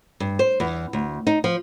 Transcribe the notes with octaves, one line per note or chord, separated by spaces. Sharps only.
G2
C5
E2
D2
D#4
F3